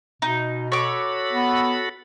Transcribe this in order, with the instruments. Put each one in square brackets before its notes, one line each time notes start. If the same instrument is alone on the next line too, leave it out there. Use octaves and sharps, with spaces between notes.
[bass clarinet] B2 [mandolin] D#4
[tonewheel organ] F#4 A4 B5 [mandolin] C#5 D6
[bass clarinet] B3